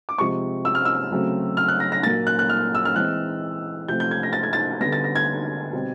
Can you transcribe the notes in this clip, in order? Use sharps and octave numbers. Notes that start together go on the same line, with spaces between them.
D6
C3 F3 G#3 C4 C#6
E6
F6
E6
C#3 F#3 A3 C4
F6
F#6
A#6
A#6
A#2 F#3 A#3 A6
F#6
F#6
F6
E6
F6
E3 G#3 C4 F#6
C3 F3 A3 C4 G6
G6
G#6
A#6
A6
G#6
A6
D3 G3 B3 A#6
A6
A#6
G#6
B2 G3 C4